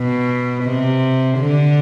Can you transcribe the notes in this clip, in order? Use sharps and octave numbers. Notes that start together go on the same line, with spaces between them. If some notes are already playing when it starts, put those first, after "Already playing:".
Already playing: B2
C3
D3